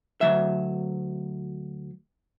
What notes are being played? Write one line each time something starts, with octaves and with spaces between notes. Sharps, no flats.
D2 A#2 F#3 E5